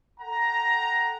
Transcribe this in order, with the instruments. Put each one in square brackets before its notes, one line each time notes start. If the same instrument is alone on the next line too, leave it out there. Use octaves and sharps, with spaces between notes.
[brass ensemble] A4 F#5 G5 A#5